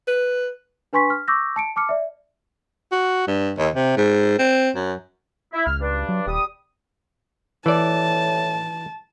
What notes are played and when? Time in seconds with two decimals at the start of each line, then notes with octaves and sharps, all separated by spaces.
0.08 B4
0.93 D4 B4 G#5 C6 C#6 B6
1.10 F6
1.28 C#6 D6 E6 G6 A#6
1.56 A5 C#7 D7
1.76 A5 D6 F6 C#7
1.89 D5 E5
2.92 F#4
3.27 G2
3.58 D#2
3.75 C3
3.97 G#2
4.39 C4
4.75 F#2
5.54 E4
5.67 C#2 F6
5.81 G2 D4
6.09 F#3
6.26 D#1 G3 D#6
7.66 A2 E3 D5 A5